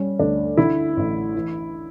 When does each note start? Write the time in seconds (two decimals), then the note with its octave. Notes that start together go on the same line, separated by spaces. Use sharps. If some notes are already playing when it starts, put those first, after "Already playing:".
Already playing: G3 C#4
0.19 D2 D4
0.57 D3 E4
0.97 A1
1.35 E3